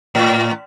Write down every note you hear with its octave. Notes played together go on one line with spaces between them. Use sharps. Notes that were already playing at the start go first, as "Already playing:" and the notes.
A2